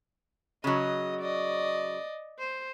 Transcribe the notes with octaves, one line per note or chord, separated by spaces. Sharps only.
C#3 F#3 D#5
D5 D#5
C5